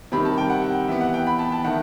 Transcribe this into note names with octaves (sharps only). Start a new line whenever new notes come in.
C3 D#3 G3 B5
A5
G5
F#5
E3 B3 E5
F#5
G5
B5
A5
A5
D#3 A3 F#5